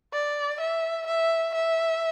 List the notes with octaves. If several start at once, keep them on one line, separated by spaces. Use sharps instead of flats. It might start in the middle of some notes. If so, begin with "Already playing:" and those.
D5
E5
E5
E5